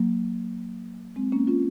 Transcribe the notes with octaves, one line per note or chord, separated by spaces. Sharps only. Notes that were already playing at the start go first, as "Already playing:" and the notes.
Already playing: F#3 A#3
G#3 C4
A#3 C#4
C#4 F4